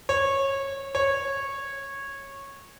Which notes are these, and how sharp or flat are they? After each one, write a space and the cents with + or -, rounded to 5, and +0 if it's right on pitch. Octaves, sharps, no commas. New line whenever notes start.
C#5 -20
C#5 -15